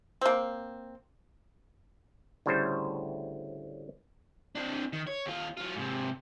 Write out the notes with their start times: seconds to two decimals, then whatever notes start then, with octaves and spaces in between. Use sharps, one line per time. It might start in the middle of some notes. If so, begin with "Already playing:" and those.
0.21 A#3 C4
2.46 D2 A2 C#3 G3 C5
4.55 C4 D4
4.93 D#3
5.07 C#5
5.26 D#2 F4
5.57 F#3 F4
5.75 G#2 C3